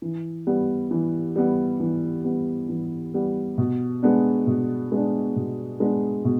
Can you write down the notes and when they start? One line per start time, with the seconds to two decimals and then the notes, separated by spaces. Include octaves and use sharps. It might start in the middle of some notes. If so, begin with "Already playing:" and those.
0.02 E3
0.47 G3 B3
0.91 E3
1.36 G3 B3
1.80 E3
2.25 G3 B3
2.69 E3
3.14 G3 B3
3.58 B2
4.02 G#3 B3 D4
4.47 B2
4.92 G#3 B3 D4
5.36 B2
5.80 G#3 B3 D4
6.25 B2